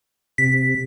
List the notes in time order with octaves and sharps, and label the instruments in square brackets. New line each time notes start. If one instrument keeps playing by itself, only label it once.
[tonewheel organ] C3 [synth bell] B6